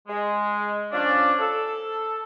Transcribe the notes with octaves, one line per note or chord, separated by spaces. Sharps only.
G#3
F3 C#4 D4
A4